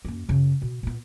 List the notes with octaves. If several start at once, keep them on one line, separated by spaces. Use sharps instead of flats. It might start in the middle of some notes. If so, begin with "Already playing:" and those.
F#2 A#3
F#2 C#3
B2
A#2 B3